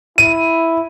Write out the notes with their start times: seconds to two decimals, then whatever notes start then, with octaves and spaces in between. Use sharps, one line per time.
0.18 E4 D#7